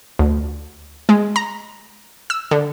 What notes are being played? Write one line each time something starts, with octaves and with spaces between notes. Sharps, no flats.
D2
G#3
A#5
E6
D3